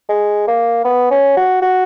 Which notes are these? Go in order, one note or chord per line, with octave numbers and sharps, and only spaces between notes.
G#3
A#3
B3
C#4
F#4
F#4